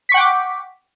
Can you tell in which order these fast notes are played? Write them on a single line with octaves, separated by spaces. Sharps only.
B6 C#6 F#5 G5 D6